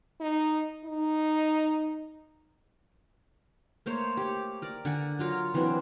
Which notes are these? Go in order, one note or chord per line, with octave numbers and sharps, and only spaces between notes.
D#4
D#4
A3 A#3 C5 C#5
G4 C#5
A#4 D5
D3 F#5 G#5
F#3 F4 A#4 C#5
E3 F#3 C4 D4